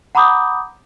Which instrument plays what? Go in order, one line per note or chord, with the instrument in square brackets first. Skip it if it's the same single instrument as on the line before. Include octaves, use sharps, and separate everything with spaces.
[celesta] F#5 A#5 B5 D6 D#6 G6